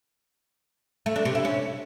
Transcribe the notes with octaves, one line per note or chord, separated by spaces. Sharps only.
A3
D4
C3
E4
C#4